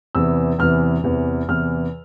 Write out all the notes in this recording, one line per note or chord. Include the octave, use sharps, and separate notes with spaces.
E2 C3 E3 E6
E2 C3 E3 F6
E2 C3 E3
E2 C3 E3 F6